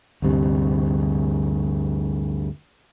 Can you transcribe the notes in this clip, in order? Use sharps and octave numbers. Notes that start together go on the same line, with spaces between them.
D2 G2 C3